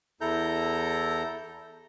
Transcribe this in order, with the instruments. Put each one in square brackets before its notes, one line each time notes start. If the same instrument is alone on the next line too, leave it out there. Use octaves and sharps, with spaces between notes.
[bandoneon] E2 E4 A4 A#5 G6